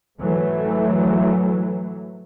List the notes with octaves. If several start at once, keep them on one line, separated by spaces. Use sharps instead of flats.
G#2 E3 F#3 A3